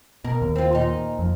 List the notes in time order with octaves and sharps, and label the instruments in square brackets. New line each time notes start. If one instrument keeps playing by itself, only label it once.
[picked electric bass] B2 [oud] A#4
[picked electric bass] D#2
[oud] C4 F4
A#2 D#4
[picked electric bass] F2